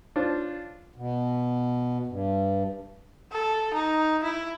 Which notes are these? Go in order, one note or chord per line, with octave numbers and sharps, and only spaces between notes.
D4 F4 C5 C#5
B2
G2
A4
D#4
E4